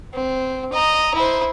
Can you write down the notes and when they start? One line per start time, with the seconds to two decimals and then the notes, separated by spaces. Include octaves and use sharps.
0.14 C4
0.72 D#5 A#5
1.15 E4 C5